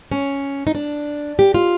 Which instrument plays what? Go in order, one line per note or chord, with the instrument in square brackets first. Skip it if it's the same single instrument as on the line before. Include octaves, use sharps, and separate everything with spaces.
[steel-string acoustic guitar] C#4
D#4
D4
G4
F4